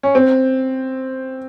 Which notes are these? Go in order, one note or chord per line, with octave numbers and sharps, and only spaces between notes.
C#4
C4